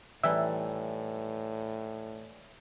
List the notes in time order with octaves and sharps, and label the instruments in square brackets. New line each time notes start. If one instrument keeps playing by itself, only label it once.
[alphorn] A2 [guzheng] E3 G3 D#4 [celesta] B4 D5 G#5 [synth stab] E5